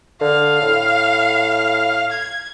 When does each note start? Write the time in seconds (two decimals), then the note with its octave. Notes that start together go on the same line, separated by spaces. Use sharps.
0.21 D3 F5
0.62 A2
2.11 G#6